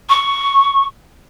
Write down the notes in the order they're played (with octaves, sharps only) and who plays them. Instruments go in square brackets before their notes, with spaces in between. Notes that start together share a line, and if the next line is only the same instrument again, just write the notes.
[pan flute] C#6